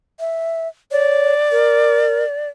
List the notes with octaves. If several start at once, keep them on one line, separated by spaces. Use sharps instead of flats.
E5
C#5 D5
A#4